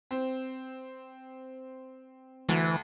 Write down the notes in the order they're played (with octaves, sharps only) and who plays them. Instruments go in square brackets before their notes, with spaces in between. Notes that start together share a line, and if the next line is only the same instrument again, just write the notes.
[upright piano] C4
[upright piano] D2 [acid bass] E3